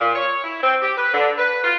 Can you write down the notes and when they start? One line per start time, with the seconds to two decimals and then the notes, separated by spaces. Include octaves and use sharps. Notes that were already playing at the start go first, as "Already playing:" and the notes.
0.01 A#2
0.15 C#5
0.44 E4
0.62 C4
0.82 G4
0.97 B4
1.14 D3
1.38 B4
1.64 F4